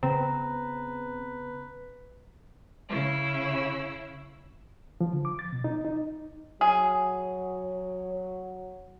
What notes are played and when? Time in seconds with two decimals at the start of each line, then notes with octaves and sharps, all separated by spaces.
0.03 C#3 B3 C4 B4 A#5
2.89 C#3 E4 E6
5.01 F3
5.13 D3
5.25 D6
5.39 A6
5.52 B2
5.64 D#4
5.85 D#4
6.61 F#3 G#4